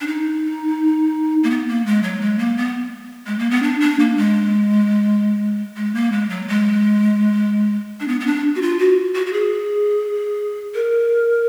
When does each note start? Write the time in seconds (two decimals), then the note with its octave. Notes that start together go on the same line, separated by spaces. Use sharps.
0.01 D4
0.07 D#4
1.43 A#3
1.50 B3
1.68 A#3
1.86 G#3
2.03 F#3
2.21 G#3
2.39 A#3
2.57 B3
3.26 G#3
3.39 A#3
3.51 B3
3.63 D4
3.81 D4
4.00 A#3
4.17 G#3
5.77 G#3
5.95 A#3
6.12 G#3
6.30 F#3
6.48 G#3
8.00 D4
8.08 B3
8.20 B3
8.26 D4
8.56 F#4
8.62 F4
8.79 F#4
9.15 F#4
9.26 F#4
9.33 G#4
10.75 A#4